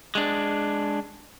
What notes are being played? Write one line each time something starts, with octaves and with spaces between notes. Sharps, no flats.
G#3 D4